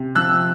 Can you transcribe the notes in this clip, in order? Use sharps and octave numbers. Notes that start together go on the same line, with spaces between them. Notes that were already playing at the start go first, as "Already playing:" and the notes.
Already playing: C3
F3 E6 F#6